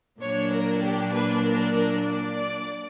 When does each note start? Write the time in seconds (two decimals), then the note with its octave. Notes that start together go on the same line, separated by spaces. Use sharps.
0.21 A#2 F#3 A#3 D4 C#5
0.52 A#4
0.82 G4
1.12 B4
1.42 A#4
1.73 A#4
2.02 D5